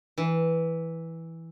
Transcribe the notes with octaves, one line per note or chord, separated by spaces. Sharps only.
E3